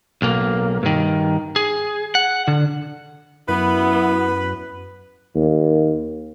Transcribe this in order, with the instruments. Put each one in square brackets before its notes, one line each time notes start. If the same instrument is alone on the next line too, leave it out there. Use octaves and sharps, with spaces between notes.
[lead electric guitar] B1 A#3
G2 D#3
G#4
F#5
D3
[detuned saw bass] F#2 [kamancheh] B3 [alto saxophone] E4 [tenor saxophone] B4
[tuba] D#2